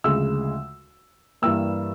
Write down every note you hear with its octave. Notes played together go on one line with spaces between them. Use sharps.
D2 C#3 F3 G#3 E6
G2 E3 G3 A#3 E6